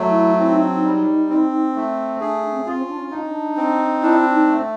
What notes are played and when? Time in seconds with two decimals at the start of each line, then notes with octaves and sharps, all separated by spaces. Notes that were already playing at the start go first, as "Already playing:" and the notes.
Already playing: F#3 A3
0.09 E4
0.39 C4 E4
0.51 D#4
0.63 D4
0.75 D#4
0.84 G3
1.29 C4
1.76 A3
2.20 D4 G#4
2.51 C4
2.59 C#4
2.66 C4 F4
2.81 C#4
2.89 D4
2.97 C#4
3.11 D4 D#4
3.21 C#4
3.30 D4
3.57 C4
4.02 D4 E4
4.32 D#4
4.47 A3